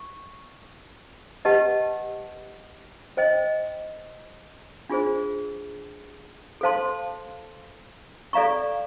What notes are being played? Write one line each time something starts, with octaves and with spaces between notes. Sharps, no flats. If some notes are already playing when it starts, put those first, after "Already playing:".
Already playing: C#6
G4 B4 D#5 F#5 A5
C5 D#5 G5
D4 F4 G#4 C5
A4 C5 F5 A5 C6
A4 D5 F5 A#5 C#6